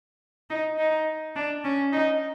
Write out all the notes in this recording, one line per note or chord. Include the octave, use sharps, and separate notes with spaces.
D#4
D#4
D4
C#4
D#4